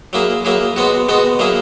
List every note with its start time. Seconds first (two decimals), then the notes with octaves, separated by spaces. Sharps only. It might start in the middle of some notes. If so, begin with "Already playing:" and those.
0.13 F#3 A#3 E4 G#4
0.45 F#3 A#3 E4 G#4
0.76 B2 G#3 B3 F#4
1.09 B2 G#3 B3 F#4
1.39 F#3 A#3 E4 G#4